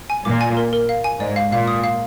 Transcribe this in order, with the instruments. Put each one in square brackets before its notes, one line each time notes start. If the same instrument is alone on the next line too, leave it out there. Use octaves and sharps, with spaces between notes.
[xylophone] G#5
[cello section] A#2 [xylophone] D6
[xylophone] G#5
A#4
A#4
F5
G#5
[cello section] G#2 [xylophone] D5
[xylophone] F5
[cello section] A#2 [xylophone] F5
[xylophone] D#6
F5